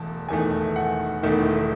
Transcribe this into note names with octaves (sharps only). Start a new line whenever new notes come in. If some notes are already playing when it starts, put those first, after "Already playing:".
Already playing: E1 E2 A3 A5
E1 E2 D#3 A3 G#5
F#5
E1 E2 D#3 A3